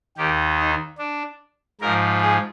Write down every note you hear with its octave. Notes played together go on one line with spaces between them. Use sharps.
D#2 D#3 G4
D#4
D4
G#2 F3 A#4
G#4